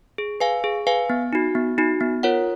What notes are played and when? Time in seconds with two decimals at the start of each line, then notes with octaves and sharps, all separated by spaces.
0.18 G#4
0.40 B4 F5 G#5
0.64 G#4
0.87 B4 F5 G#5
1.10 B3
1.33 D#4 F#4
1.55 B3
1.78 D#4 F#4
2.01 B3
2.23 F4 A#4 C#5 F#5